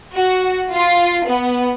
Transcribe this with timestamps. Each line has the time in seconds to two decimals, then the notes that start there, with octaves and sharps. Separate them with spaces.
0.17 F#4
0.73 F4
1.27 B3